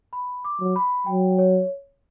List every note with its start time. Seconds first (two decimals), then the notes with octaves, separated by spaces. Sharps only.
0.13 B5
0.44 D6
0.60 F#3
0.76 B5
1.06 F#3 G5
1.38 C#5